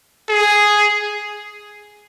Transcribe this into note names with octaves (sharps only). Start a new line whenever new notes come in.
G#4